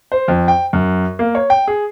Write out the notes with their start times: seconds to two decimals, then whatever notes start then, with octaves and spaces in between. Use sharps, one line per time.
0.12 C5
0.28 F2
0.48 G5
0.73 F#2
1.19 A#3
1.35 C#5
1.50 G5
1.68 G#4